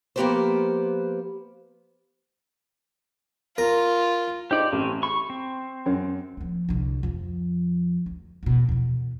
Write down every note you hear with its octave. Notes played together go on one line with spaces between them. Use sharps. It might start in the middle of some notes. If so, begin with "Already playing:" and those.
F3 A#3 B3 G4 B4 C5
F4 A#4
D#4 G4 C5 D5
A1 C4 C#4
B5 C#6
C4
F#2
F3 A#3
C2 D3
F2 F3
D2
E2 B2
E2 B2